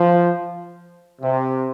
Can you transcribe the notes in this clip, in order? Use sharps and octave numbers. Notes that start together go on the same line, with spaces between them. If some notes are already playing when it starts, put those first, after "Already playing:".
Already playing: F3
C3